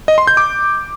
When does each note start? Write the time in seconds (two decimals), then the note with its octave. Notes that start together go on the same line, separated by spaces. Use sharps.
0.08 D#5
0.18 C6
0.27 G6
0.37 D6